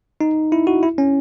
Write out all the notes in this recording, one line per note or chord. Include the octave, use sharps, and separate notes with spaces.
D#4
E4
F#4
E4
C#4